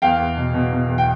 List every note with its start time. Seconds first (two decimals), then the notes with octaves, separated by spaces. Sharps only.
0.02 E2 F5 G5
0.19 E2
0.37 B2
0.54 B2
0.72 B2
0.88 E2
0.98 G5